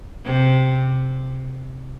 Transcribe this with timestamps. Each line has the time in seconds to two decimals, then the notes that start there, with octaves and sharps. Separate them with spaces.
0.24 C3